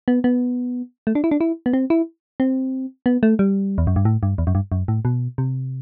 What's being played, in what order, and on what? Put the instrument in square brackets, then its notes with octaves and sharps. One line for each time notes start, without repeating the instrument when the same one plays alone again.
[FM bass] B3
B3
A3
D4
E4
D4
E4
B3
C4
E4
C4
B3
A3
G3
E2
F#2
G2
A2
G2
E2
F#2
G2
F#2
A2
B2
C3